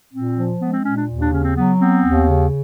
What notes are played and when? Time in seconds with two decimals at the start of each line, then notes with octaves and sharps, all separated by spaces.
0.12 A#2 C4
0.36 F3
0.59 G#3 B3
0.72 C4
0.83 A#2 C#4
0.96 D4
1.08 D#2
1.19 D4
1.31 C#3 C#4
1.43 C4
1.54 F#3 B3
1.79 B3 C4
2.03 D#2
2.27 C#3